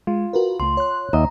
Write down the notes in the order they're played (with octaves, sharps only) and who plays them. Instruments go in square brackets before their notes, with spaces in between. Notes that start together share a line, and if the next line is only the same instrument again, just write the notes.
[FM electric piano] G#3 [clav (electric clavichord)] F4
[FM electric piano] F#4 A#4 B4
[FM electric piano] C#2 A3 [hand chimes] C6
[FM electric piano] C#5 F#6
[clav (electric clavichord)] D#2 D#5 E5 [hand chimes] A#5